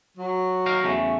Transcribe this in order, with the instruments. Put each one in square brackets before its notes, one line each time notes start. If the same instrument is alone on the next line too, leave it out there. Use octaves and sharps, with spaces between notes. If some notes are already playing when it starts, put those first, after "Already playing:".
[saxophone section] F#3
[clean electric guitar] D#4 A#4 F5
E2 C#3 A3